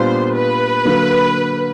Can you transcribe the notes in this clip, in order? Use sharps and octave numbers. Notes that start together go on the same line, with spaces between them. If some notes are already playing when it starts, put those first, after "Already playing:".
Already playing: A#2 G3 B3 D4 F4 C5
B4
D3 F#3 A#3